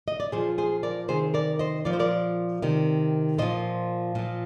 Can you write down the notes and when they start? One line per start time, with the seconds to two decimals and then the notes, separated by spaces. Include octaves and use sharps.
0.08 D#5
0.20 D5
0.32 A#2 F3 G#4 C5
0.58 G#4 C5
0.83 A#4 D5
1.08 C3 D#3 G#4 C5
1.34 A#4 D5
1.59 C5 D#5
1.85 A#2 F3 D5
1.93 C5
1.99 A#4 D5
2.62 C3 D#3
3.38 A#2 F3 C5 D#5
4.15 A#2 F3